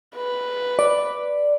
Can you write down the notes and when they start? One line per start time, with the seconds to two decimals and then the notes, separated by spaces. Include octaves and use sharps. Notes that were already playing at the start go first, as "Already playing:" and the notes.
0.15 B4
0.79 D5